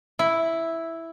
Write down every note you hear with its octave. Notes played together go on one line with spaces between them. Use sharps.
E4